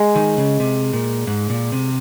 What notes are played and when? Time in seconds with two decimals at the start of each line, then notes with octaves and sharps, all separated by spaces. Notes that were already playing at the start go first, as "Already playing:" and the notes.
Already playing: G#3
0.16 D#3
0.38 C#3
0.60 C3
0.93 A#2
1.27 G#2
1.50 A#2
1.72 C3